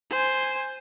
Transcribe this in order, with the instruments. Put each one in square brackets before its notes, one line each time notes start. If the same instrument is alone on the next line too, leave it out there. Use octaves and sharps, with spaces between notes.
[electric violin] C5 G#5